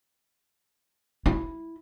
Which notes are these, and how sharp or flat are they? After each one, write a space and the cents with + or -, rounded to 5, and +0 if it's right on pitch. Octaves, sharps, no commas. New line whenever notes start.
E4 -5